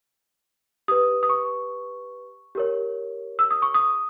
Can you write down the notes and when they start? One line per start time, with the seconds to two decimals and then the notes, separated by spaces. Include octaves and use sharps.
0.88 G4 B4 D#6
1.23 D#6
1.29 C#6
2.55 G4 A#4 C#5
3.39 E6
3.51 D#6
3.62 C#6
3.74 D#6